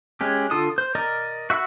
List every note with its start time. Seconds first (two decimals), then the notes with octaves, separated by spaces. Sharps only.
0.21 G#3 C#4 G4
0.51 D3 F4 A4 D#6
0.78 C5
0.95 A#4 D5 D#5
1.50 F#4 E5 F#5 B5